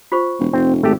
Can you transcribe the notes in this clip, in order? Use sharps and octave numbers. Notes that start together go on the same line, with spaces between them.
F4 C5 C#6
E1
F1 C4
G#1 A3 G4